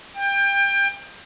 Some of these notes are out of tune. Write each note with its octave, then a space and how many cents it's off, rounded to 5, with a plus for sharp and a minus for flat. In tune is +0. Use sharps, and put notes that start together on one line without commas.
G5 +25